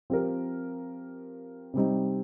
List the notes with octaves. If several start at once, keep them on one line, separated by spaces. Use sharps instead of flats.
F3 C4 G4 A#4
C3 G3 C4 D#4